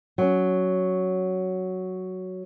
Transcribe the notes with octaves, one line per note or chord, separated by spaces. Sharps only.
F#3 C#4